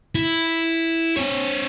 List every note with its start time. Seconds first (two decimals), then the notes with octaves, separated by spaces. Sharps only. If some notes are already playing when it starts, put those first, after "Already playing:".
0.15 E4
1.17 C4 C#5